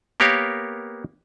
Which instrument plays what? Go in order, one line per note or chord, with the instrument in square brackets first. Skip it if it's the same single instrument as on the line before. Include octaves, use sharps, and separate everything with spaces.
[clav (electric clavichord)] A#3 B3 G4 A#4 C#5 F5